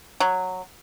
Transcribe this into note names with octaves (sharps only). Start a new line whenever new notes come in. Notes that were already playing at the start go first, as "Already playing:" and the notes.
F#3